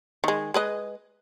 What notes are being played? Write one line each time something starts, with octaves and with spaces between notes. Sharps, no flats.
D#3 G#3
G#3 B4 D#5